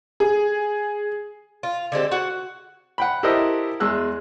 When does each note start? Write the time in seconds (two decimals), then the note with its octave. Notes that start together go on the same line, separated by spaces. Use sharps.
0.20 G#4
1.63 F4
1.92 D3 G#3 C4 G4
2.12 F#4 F#5
2.98 F#5 G5 B5
3.23 E4 G4 A4 A#4 C5 D#5
3.80 E2 G#3 E6 F#6